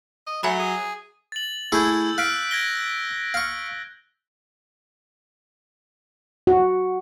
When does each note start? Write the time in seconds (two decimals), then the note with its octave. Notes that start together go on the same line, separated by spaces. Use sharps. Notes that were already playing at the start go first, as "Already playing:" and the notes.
0.27 D#5
0.43 F#3 A3 E5 G#5 B5
0.59 G#4
1.32 A6 F#7
1.72 A3 E4 G#4 E6 G6
2.18 F5 F#6 B6 D7
2.51 G#6 A#6 G7
3.34 F5 C#6
6.47 F#4